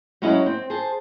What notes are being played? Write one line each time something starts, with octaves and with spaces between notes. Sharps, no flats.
F#3 G#3 C#4 E4 G#4 D#5
C4
G#4 C5 A5